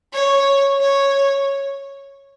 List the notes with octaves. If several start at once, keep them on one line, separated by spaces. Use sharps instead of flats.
C#5
C#5